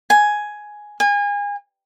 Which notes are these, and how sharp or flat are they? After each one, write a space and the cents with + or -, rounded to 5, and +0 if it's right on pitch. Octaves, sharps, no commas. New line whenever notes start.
G#5 +5
G#5 -30